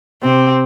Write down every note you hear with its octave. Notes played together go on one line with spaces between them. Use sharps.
C3 C4